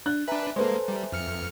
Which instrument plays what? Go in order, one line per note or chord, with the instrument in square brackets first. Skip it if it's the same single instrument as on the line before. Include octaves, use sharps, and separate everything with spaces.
[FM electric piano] D4 [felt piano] F#6
[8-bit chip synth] D4 B4 [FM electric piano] E5 G#5 A#5
[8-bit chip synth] G#3 A#3 [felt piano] A4 B4 C5
[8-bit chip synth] G3
F2 F6 C#7